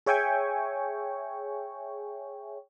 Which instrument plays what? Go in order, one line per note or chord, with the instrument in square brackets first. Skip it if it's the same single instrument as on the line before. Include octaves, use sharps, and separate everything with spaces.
[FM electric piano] G#4 C#5 E5 G5 G#5 C#6